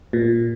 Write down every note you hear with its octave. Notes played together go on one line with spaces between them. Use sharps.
A#2